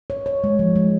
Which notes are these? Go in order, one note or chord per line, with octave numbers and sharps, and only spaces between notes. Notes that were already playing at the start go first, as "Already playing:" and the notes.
C#5
C#5
G#3
F3
G#3